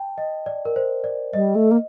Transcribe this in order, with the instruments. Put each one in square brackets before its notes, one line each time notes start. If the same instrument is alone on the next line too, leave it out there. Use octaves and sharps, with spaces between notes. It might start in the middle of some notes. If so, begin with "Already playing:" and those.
Already playing: [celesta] G5 A5
D#5
D5
A#4
C5
D5
[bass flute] G3 [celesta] D#5
[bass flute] A3
A#3